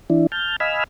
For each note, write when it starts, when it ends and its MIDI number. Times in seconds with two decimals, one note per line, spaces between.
0.10 0.27 52
0.10 0.27 62
0.10 0.27 64
0.32 0.56 81
0.32 0.56 89
0.32 0.56 91
0.60 0.84 75
0.60 0.84 77
0.60 0.84 80
0.60 0.84 83
0.60 0.84 88
0.60 0.84 89